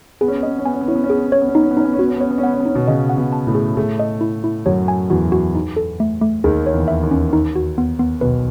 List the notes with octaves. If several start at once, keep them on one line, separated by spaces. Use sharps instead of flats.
B3 G#4
C#4
B3
C#4 D#5
B3
C#4
B3 G#5
C#4
B3
C#4 E4
B3
C#4
B3 G#4
C#4
B3
C#4 C#5
B3
C#4
B3 D#4
C#4
B3
C#4 D#4
B3
C#4
B3 F#4
C#4
B3
C#4 C#5
B3
C#4
B3 F#5
C#4
B3
C#4 D#4
B2 B3
C#3 C#4 D#5
F#5
B2 B3
A5
A2 A3
G#4
A2 A3 G#4
D#5
E4
E4
F#2 F#3 C#5
G#5
E2 E3 F#4
F#4
D#4
A4
A3
A3
D#2 D#3 G#4
C#5
E2 E3
E5
D#2 D#3
C#4
D#4
F#4
B3
B3
B1 B2 B4